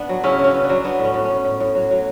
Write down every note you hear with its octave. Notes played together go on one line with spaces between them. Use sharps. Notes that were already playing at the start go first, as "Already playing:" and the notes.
Already playing: B3 D4
F#3
C#3 C#4 E4
C#3 C#4
B3
D4
F#3
B3 D4
A2
C#4
A2
C#4
A2
A2
A2
F#3
F#3